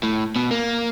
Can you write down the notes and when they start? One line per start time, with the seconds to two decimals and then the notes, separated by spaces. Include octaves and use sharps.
0.03 A2
0.36 B2
0.51 A#3